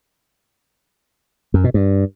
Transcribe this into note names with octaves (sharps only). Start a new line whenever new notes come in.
F#2
B2
G2